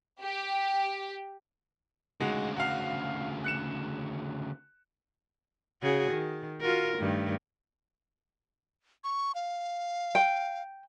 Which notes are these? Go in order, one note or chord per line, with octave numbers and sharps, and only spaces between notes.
G4
D2 C#3 G#3 D#4 F#4
F#4 F5
F#6 C#7 E7
C#3 F#4 G#4
D#3
F4 F#4 A#4
G2 D#3 A3
C#6
F5
G5